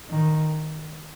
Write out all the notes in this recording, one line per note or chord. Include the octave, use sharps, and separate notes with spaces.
D#3